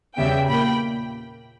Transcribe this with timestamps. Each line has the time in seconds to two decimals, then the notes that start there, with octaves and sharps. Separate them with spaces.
0.16 E2 C#3 G3 B3 E5 G5
0.48 A#2 A#3 G5 B5